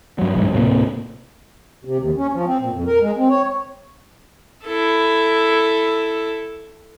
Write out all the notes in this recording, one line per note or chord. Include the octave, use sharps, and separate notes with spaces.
G2 F#3
F#1 B1 G#2
D1 A2 C3 A#3
C3
D#2
C#4
F3
C4
A#2
F2
A#4
G#3
C4
C#5
E4 A4